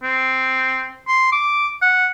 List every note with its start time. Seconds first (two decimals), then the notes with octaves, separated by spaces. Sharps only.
0.03 C4
1.08 C6
1.32 D6
1.82 F#5